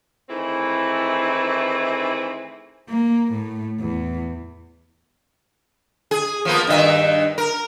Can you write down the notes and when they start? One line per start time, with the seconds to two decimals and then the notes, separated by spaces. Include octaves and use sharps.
0.29 D#3 E3 A3 C4 E4 G#4
2.89 A#3
3.32 A2
3.81 E2
6.11 G#4
6.45 F3 A#3 B3
6.67 G2 D#3 E5
7.38 A#4